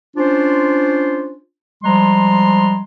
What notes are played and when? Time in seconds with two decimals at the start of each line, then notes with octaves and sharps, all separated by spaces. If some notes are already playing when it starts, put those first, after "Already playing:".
0.17 C#4 D4 F4 C5
1.84 F3 G3 G#3 A#5 C6